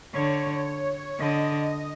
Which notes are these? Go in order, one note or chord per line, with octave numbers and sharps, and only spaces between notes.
D3 C#5
D3 D#5